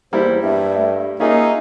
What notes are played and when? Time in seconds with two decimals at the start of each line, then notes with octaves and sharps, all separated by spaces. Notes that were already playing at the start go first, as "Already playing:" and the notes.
0.13 E2 G3 A#3 E4 C5
0.43 G2 E5
0.78 A3
1.20 A#3 C#4 D#4 F4 G#4 E5